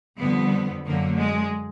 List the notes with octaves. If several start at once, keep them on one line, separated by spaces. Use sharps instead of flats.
F2 D3 G3 B3
F#2 D3 F#3 A#3
G#3